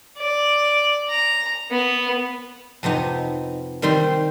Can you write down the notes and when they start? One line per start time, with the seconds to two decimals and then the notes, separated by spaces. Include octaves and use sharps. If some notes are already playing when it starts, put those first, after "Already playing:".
0.18 D5
1.10 A#5
1.71 B3
2.83 F2 C3 B3 D#4
3.82 D#3 G3 C4 D#4 C6